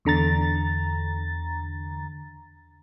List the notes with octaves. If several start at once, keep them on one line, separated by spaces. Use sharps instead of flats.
E2 D3 A#5 A6